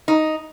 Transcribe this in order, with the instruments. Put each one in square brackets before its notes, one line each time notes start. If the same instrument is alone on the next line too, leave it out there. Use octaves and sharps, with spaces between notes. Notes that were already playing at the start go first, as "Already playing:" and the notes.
[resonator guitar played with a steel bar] D#4